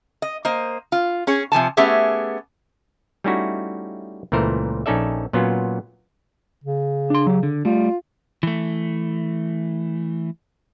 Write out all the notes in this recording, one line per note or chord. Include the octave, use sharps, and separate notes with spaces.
D#5
A#3 C5 D#5
F4
C#4 G#4 C#5
C3 F3 G#5 A5
A3 B3 C#4 G4 G#4 E5
G3 A3 C#4 D#4 E4 F#4
C#2 A#2 E3 A3 A#4 C5
A#1 C#4 D#4 A4 D5 E5
A#2 F#3 B3 C#4 F4
C#3
D4 C6
F#3 G4
D3
G3 A3 F4
E3 A3